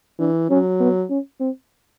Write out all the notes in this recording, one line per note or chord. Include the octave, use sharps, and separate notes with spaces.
E3 D4
F#3 C#4
B3
C#4
C4